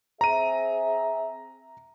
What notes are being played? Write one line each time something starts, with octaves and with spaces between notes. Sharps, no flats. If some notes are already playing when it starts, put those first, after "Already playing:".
C4 G#4 E5 A#5 D#7